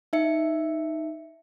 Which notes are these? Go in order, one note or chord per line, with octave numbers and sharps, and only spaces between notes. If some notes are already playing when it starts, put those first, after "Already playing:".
D#4 E5 C#7